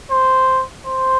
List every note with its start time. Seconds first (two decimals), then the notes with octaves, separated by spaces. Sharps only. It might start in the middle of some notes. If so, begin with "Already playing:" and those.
0.11 C5
0.87 C5